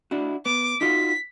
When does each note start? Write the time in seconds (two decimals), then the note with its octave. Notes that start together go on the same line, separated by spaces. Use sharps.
0.11 D4 E4 F#4
0.46 B3 D6
0.81 D#4 F4 F#4 B6